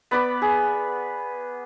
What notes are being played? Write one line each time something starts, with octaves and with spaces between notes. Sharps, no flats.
B3 D5 B5
G#4